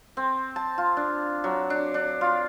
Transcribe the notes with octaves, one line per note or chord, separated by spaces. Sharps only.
C4
A5
F4
D4
F#3
D4
D4
F4